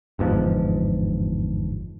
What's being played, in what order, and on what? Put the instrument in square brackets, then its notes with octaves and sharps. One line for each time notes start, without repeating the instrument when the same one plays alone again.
[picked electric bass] G1 E2 G#2 F3